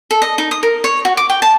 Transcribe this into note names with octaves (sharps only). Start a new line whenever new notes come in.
A4
D#5
D#4
D#6
A#4
C#5
F#4
D6
G5
A5